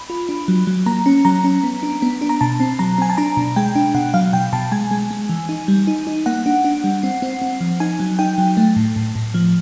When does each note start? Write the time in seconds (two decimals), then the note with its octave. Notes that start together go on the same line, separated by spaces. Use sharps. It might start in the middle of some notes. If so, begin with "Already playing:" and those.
Already playing: B5
0.10 F4
0.29 D4
0.48 F#3
0.67 F#3
0.86 A#3 A#5
1.06 C#4
1.25 F#3 A#5
1.44 C#4
1.63 B3
1.83 D4
2.02 B3
2.21 D4
2.29 A#5
2.41 B2 A5
2.60 C4
2.79 F#3 A#5
2.98 C4 G#5
3.10 A5
3.17 D4 A#5
3.37 B2
3.56 G#3 G5
3.75 D4
3.94 B2 F#5
4.14 F#3 F5
4.33 B2 G5
4.53 B2 A5
4.72 G#3 G#5
4.91 G#3
5.11 G#3
5.29 E3
5.49 D#4
5.68 G3
5.87 D#4
6.07 D#4
6.26 A#3 F#5
6.46 D4
6.65 D4
6.84 G3
7.03 C4
7.22 C4
7.42 C4
7.61 F3
7.80 D#4 G#5
8.00 F#3
8.19 D#4 G5
8.38 F#3
8.57 A3
8.76 A2
8.96 A2
9.15 A2
9.34 F3